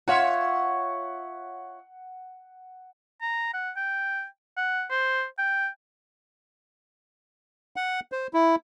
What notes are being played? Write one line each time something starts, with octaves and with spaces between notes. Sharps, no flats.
F4 C#5 E5 F#5
A#5
F#5
G5
F#5
C5
G5
F#5
C5
E4